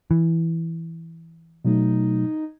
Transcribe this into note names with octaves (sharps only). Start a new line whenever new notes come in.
E3
B2 F#3 A3 D#4